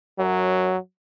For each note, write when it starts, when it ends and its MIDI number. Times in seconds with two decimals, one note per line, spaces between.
0.19 0.70 42
0.19 0.78 54